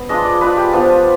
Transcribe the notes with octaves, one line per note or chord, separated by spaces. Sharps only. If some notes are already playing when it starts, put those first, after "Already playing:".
Already playing: B3
G#3 D4 F4 D#5
D5
G#3 D4 F4 B4
G4
F3 B3 D4 F4